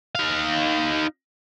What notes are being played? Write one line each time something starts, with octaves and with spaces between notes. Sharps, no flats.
D#4 F5